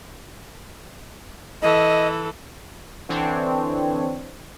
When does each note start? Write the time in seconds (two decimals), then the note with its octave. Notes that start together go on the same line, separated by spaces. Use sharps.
1.62 E3 A4 D#5
3.09 D3 E3 C4 D4 C#5